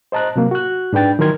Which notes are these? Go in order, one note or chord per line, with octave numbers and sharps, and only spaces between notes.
C5 D#5 A5 A#5 F#6
C3 F#3 A#3
F#4 F#6
G#2 D4 B4 G5 A6
D#3 E3 F#3 A#4 C6 G#6